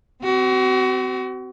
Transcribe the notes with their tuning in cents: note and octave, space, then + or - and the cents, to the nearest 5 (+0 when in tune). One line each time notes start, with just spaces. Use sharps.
C4 -25 F#4 +30